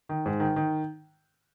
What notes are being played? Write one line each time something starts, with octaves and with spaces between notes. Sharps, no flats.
D#3
G#2
D#3
D#3